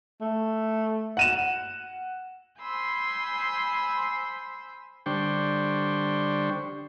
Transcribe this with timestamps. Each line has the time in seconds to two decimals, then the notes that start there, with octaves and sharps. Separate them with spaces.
0.21 A3
1.17 F#5 D#7 E7
2.60 C5 G#5 B5 C6 E6 G6
5.06 D3 G3 D4 C5 G5 C#6